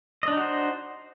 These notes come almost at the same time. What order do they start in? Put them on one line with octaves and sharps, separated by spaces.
D#5 D4 D#4 F#4 C5